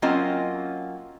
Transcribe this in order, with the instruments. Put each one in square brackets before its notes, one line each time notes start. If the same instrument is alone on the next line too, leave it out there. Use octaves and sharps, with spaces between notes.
[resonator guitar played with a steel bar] F#3 A#3 C4 C#4 F4 D#5